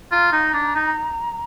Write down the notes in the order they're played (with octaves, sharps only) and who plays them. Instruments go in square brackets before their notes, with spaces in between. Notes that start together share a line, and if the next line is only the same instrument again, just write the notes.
[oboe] F4 [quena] A#5
[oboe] D#4
D4
D#4